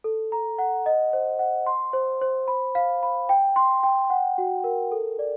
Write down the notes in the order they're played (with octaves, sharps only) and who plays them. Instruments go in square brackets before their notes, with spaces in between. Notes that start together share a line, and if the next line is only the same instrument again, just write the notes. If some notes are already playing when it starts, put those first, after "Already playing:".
[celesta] A4
A#5
F#5
D#5
C5
F#5
C6
C5
C5
B5
F5
B5
G5
C6
G5
F#5
F#4
A#4
A4
D5